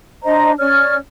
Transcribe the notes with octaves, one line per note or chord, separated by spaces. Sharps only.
D4 C5 D#5 A#5
C#4 C#5 D5 F6